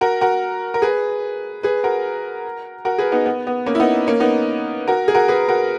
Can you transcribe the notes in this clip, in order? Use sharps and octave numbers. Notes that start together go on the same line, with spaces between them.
F#4 A#4
F#4 A#4
A#4
G#4 B4
G#4 B4
F#4 A#4
F#4 A#4
G#4 B4
B3 D#4
B3
B3
A#3 C#4
E4
B3 D#4
A#3 C#4
B3 D#4
F#4 A#4
G#4
F#4 A#4
G#4 B4
F#4 A#4